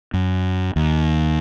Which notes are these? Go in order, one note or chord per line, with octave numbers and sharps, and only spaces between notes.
F#2
D#2